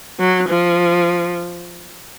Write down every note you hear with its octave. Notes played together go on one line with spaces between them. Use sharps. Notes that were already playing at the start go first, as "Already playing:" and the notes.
F#3
F3